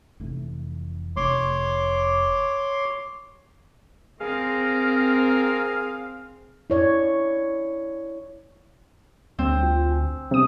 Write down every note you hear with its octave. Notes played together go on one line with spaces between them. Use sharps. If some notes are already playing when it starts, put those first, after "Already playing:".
F1 E3
F1 C#5 C6 D6
C4 G#4 A#4 F5
E4 C#5 D5
D2 G3 C4
F4
G#5
C3 G3 B3 D#6